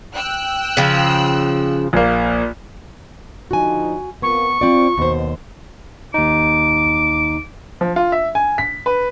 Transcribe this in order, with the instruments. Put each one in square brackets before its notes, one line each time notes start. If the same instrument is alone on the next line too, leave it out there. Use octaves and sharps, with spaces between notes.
[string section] G5 E6 F#6
[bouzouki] C#3 F3
[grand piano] A#1 A#3
[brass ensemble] D3 F3 D#4 [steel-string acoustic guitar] F#4 G#5
[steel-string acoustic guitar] B3 [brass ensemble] C4 F4 A#4 [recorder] C#6
[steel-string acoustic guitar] C4 D5 [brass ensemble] F4
[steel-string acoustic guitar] D#2 C5 [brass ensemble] B2
[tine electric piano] D#2 D#4 [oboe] D6
[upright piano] F3
F4
E5
G#5
B6
B4